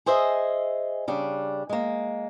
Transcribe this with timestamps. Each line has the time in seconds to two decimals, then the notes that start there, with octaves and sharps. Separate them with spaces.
0.06 G#4 C5 D#5 E5 G#5
1.08 C#3 G3 D4
1.69 G#3 A#3